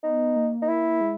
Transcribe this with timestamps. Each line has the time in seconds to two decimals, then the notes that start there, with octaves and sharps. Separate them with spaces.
0.03 B3 D#4
0.36 A#3
0.62 D#4
0.68 E4
1.01 G#3